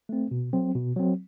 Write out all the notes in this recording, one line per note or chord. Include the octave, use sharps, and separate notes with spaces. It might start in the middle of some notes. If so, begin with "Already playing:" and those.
A3 C4
B2
F#3 C4
B2
F#3 C4